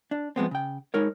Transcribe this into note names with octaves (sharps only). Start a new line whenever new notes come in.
D4
F3 G#3 B3 C4
C#3 G5
G#3 D#4 A#4 C#5